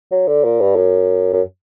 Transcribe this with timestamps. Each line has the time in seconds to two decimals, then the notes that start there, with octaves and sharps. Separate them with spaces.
0.11 F#3
0.27 D3
0.44 A#2
0.60 G2
0.76 F#2
1.33 F#2